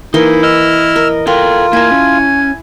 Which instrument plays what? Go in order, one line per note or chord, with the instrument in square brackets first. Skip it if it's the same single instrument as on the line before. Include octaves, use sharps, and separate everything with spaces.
[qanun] E3 A#3 C6 [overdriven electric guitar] D#4 [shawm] E4
[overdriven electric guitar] D#5 [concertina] E6 F6
[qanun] A#4
[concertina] F4 [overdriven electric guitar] A4 G5 [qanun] A#4
[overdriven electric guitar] A#3 A#4 [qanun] E4 A5 [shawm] G#5
[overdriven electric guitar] C#4